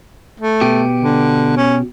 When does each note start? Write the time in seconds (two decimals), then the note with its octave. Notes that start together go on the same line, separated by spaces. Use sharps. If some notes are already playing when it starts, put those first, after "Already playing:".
0.40 A3
0.61 B2 G4
1.02 D3
1.57 C#4